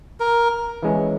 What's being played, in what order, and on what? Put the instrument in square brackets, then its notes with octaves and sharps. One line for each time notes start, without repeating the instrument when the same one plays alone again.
[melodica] A#4
[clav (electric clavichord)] E3 G#3 C#4